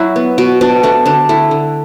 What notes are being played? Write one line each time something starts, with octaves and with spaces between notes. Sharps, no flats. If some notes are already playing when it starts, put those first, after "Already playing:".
Already playing: F#3 E4 F#4
B3
B2 F#4
B2 D4
A3 D4
D3 D4
A3 E4
D3